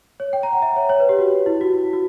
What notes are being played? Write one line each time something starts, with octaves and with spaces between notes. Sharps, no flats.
C#5
G5
A#5
F#5
E5
C#5
C#5
B4
G4
F#4
E4
F#4
F#4
E4
F#4